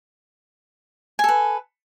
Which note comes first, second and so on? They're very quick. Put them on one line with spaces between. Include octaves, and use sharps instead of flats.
G#5 A4 B4